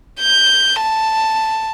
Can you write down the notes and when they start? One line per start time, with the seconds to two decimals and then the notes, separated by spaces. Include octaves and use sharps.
0.21 G6
0.81 A5